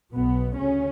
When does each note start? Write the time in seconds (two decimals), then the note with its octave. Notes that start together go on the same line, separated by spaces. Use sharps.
0.15 B1 B2 B3
0.57 D2 C#3 C#4